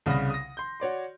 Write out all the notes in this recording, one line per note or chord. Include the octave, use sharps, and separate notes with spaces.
C2 C#3 D5 B5 D#6 A#6
D#6 A#6
C6 G6
F#4 C#5 D5 C6